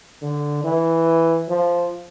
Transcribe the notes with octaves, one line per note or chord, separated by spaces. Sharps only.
D3
E3
F3